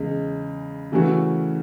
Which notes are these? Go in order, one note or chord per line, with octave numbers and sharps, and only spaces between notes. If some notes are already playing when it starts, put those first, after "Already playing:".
Already playing: E2 C#3 G#3
C#3 E3 A3 C#4 F#4